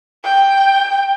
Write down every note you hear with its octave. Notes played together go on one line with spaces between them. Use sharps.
G5